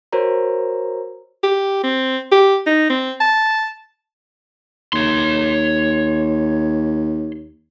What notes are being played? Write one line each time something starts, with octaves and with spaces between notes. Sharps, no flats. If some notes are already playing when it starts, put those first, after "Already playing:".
F#4 A#4 C5 C#5 A#5
G4
C4
G4
D#4
C4
A5
D#2 C#5 C6